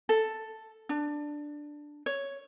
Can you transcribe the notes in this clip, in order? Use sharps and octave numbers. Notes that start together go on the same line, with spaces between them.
A4
D4
C#5